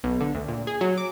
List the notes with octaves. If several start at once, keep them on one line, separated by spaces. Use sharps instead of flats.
B1
D3
D2
A#2
G#4
F#3
D6